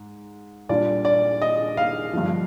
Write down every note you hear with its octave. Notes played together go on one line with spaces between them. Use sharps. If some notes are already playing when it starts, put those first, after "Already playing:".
Already playing: G#2
A#2 G3 D4 F4 D5
D5
D#5
F5
G2 D3 F3